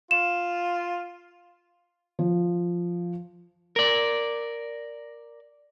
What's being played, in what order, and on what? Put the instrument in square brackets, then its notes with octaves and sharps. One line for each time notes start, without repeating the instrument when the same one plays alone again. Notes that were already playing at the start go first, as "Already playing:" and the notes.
[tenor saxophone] F4 [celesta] E7
[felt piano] F3
[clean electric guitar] A#4 D5